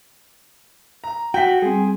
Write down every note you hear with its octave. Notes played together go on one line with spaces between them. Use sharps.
A#5
F#4 G5 B6
G3 C4 G#4